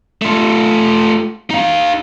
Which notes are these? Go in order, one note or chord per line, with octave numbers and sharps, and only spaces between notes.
A3 F4
D#4 F5